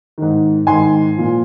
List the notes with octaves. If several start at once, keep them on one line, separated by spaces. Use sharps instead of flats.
G#2 D#3
G#2 D#3 G#5 C6
A#2 F3